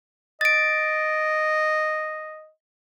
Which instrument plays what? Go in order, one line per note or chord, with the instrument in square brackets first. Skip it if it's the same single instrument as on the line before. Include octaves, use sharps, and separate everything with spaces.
[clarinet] D#5 [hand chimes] A6 D7